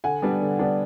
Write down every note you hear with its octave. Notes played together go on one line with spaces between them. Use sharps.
D3 F#5 G#5
G3 B3 D4
D3
G3 B3 D4